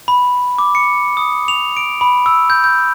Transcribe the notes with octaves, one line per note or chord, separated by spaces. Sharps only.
B5
D6
C#7
D#6
F7
D7
B5
E6
G6
G6